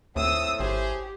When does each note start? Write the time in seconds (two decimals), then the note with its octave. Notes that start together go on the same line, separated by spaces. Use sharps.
0.16 D#2 A2 C4 D#6 E6
0.59 G#1 G4 G#4 C5